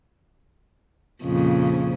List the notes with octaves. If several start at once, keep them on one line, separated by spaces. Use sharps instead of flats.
F2 A#2 C#3